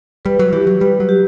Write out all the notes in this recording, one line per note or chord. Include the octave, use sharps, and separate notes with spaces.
G3 B4
F#3
E3 G4
F#3
G3 B4
F#3
G4